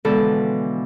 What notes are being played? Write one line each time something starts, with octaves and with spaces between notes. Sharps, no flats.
B2 D3 E3 F3 G#3 A4